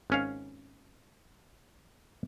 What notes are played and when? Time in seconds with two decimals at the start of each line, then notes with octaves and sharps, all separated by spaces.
0.10 G#1 C#4 F5